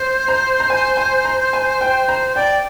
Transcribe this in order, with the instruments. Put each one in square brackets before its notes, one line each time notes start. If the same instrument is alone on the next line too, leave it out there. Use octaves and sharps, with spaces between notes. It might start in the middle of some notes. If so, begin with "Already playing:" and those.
Already playing: [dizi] C5
[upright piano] A#5
A#5
G#5
G#5
A#5
G#5
G5
A#5
[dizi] D5 [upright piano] G5